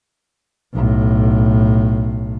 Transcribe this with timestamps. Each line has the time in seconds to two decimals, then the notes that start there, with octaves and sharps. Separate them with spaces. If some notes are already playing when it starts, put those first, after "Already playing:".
0.74 B1 A2